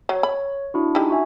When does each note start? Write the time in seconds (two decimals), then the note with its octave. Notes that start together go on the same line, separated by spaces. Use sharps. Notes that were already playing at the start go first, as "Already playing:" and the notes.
0.09 F#3 C#5
0.23 B5
0.74 D4 E4 F#4
0.95 G3 G#3 D#4
1.10 F#4 E5 G#5